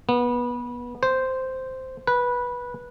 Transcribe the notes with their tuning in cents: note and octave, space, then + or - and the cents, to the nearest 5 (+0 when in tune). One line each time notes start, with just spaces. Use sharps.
B3 -25
C5 -5
B4 -15